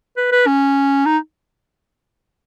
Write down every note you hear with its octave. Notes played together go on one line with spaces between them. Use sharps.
B4
B4
C#4
D#4